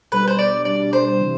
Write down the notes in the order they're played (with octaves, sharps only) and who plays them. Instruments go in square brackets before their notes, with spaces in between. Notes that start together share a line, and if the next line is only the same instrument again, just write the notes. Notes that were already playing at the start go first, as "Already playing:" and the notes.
[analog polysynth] B2 G3 D4 [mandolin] B4
[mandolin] C5
D5
[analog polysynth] B2 G3 D4 [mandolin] D5
[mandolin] C5
[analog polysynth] C3 E3